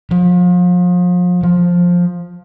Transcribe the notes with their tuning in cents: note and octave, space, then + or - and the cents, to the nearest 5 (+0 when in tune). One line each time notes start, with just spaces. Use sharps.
F3 +35
F3 +10